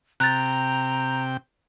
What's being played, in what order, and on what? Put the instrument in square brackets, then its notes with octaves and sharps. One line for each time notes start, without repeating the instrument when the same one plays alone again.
[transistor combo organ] C3 G5 [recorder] A#5 [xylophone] F#6 A6